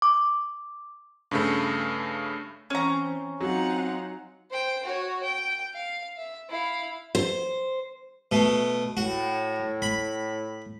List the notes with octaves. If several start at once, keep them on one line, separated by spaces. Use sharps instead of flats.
D6
G2 C#3 A3
E3 C4 C#4 A#5
F#3 C4 D#4 F4 F#5
C5 G5
F#4 C#5
G5
F5
E5
E4 F5
C5
B2 A3
A2 F#4
B5